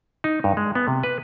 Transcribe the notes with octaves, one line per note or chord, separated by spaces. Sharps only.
D#4
G2
G#3
B3
C3
B4